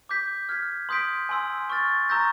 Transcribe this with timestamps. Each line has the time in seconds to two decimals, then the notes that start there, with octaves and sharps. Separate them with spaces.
0.09 D6 G6 B6
0.49 F6 G#6 B6
0.89 C6 D#6 G6 B6 D7
1.29 G#5 C6 E6
1.70 C#6 F6 A6
2.09 A#5 C#6 E6 G6 A#6